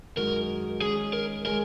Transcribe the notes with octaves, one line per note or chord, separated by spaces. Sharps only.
F#2 D#3 G#3 D#4 F#4 A#4
D#3 G#3 C#4 G#4
A#4
D#3 G#3 C#4 G#4 A#4